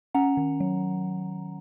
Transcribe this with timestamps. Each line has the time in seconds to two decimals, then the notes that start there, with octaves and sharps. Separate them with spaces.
0.14 C#4 F#5 A#5
0.37 D#3
0.60 F#3